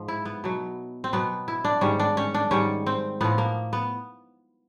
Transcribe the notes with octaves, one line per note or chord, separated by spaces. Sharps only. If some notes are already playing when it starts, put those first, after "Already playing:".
Already playing: G#2 F3
E4
B3
B2 F#3
C4
B2 F#3 B3
E4
D4
G#2 D#3 G3 C#4
D4
C#4
D4
G#2 D#3 G3 C#4
C4
A2 F3 B3
A#3
B3